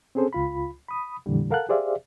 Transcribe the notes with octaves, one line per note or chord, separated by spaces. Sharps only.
C4 C#4 G#4 A4 C5
C#2 F4 B5
B5 D#6
F2 A#2 D3 E3 G3
A4 A#4 F5 F#5 A5 F#6
G4 G#4 C5 D5 E5 F5